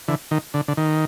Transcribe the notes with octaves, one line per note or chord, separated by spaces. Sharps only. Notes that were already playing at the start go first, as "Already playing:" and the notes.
D3 E3
D#3
D3
D3
D#3